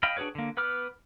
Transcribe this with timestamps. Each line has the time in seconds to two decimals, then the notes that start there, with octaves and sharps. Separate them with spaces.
0.03 D#5 F5 G5 B5
0.17 D4 F#4 G#4 B4 C#5
0.35 D3 A#3
0.57 B3 B4 B5 D6 F6